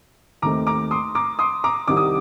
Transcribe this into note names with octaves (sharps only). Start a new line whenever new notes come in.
D#2 D#3 A3 C4 A#5 D6
A#5 D6
C6 D#6
A#5 D6
C6 D#6
A#5 D6
C2 C3 D#3 G3 C4 D6
D#6